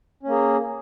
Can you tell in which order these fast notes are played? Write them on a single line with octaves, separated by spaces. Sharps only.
C#4 A#3 G#4